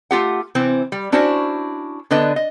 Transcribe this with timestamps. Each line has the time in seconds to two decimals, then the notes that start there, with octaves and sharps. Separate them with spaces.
0.11 A3 F4 G4 F#5
0.55 C3 E3 C4
0.92 G3
1.12 C#4 D4 E4 F#4 C5
2.11 D3 B3 D4 B4 D#5
2.36 D#5